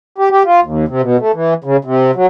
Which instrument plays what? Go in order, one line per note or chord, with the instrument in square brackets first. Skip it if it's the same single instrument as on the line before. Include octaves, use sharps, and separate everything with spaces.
[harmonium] G4
G4
F4
D#2
C3
B2
A3
E3
C#3
C3
F#3